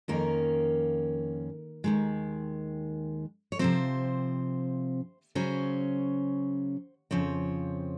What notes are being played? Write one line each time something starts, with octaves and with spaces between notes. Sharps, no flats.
F2 D#3 A#3 C#4 A#4
D#2 D#3 G#3
C#5
C3 F3 C4 C5
C#3 F#3 C#4 C5
F2 C#3 F3 C4 C#5